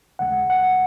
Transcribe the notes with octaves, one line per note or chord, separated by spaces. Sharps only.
D#2 C#3 G#3 F#5
F#5